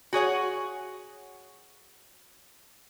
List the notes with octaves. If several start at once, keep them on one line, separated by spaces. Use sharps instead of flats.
F#4 G#4 C#5 F#5